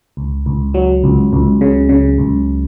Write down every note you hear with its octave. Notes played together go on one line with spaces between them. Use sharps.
C#2
C#2
F#3
C#2
C#2
C#3
C#3
C#2